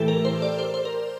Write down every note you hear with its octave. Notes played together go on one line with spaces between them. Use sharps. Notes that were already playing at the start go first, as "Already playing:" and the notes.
Already playing: A2 E3 A3 G4 A4
A#4
C5
D5
C5
C5
A#4